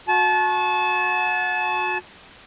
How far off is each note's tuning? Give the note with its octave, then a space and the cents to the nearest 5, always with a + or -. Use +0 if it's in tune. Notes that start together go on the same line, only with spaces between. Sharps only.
F#4 -30 A5 -30